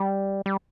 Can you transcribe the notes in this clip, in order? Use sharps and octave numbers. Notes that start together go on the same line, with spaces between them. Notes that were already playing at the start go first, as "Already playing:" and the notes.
Already playing: G3
G3